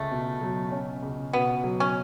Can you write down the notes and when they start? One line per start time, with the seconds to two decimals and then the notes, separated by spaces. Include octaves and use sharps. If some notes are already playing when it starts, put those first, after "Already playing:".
Already playing: C#2 A3 C#4
0.11 B2
0.41 F#3
0.72 C#4
1.03 C#2
1.33 B2 B3
1.64 F#3
1.80 C#4